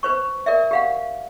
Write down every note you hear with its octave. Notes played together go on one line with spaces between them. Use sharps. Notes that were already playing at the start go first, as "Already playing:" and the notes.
B4 C5 C#6
A#4 D5 E5
G4 F5 F#5